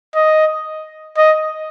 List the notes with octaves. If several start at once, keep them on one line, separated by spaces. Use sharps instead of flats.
D#5
D#5